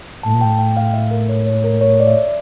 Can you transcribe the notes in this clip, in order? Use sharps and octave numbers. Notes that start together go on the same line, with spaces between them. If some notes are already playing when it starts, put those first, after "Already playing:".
A2 A5
A#2
A2 G5
G5
F5
E5
A#4
C#5
C#5
A#4
C#5
D5
E5